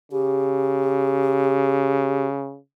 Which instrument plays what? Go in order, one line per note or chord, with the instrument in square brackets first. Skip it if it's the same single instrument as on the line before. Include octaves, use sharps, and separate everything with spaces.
[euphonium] C#3 [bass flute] G4